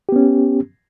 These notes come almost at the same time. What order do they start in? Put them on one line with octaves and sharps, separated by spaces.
G4 B3 C#4